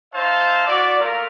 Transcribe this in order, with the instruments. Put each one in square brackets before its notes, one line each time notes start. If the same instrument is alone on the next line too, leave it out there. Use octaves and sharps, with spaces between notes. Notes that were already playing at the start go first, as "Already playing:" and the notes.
[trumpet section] D#4 C5 E5 F5 A5
E4 F#4 D5
A3 A#3 F4 A#4